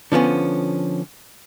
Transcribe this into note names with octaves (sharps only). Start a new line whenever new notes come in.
D3 F3 B3 C#4